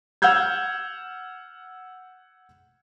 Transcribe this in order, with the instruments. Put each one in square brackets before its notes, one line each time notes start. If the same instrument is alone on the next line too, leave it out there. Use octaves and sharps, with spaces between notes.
[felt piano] F#5 E6 F6 G6 G#6